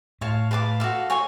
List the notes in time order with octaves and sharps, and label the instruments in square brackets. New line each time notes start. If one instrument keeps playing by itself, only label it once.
[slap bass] A2 [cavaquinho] C#5 F5 A5
[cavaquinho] B4 F5 A5 D6
F#4 A4 F5
C#5 G#5 C#6